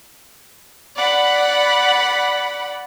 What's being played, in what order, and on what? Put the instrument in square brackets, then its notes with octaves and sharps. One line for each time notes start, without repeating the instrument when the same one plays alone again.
[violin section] D5 F#5 B5